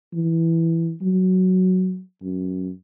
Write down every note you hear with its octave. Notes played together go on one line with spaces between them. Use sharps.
E3
F#3
F#2